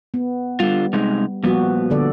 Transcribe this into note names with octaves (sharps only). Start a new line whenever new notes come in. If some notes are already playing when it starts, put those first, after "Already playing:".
B3
D3 G3 F4
C3 G#3 D#4
A#2 F3 G3 B3 F#4
D3 A4 D5